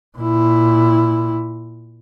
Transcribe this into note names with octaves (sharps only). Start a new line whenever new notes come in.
A#2 E4